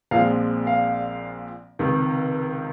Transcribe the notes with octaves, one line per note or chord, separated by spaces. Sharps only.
A#1 A#2 F3 G#3 C4 F5
F5
C#2 C3 D#3